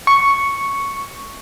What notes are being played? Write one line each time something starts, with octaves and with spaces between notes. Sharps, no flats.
C#6